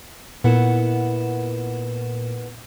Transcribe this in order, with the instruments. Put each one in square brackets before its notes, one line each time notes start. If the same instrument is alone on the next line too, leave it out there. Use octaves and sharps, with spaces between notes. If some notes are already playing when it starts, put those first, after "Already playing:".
[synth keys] A#2 A#4 E7 [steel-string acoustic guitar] B3 E4 F#5